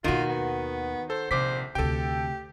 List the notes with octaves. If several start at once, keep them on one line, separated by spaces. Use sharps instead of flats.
D#2 B2 D#3 F4 F#4
B3
A4 C5
A#1 C3 C5 D6 B6
D2 C3 G4 A4 G5